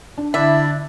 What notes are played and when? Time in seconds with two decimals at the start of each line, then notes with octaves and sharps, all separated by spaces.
0.18 D4
0.34 D3 D4 E4 D5 E5